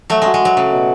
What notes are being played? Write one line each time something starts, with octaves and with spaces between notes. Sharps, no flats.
F#3 A3 E5
G#3 F#4
G#3
F#3 F#4
C#3 A3
B2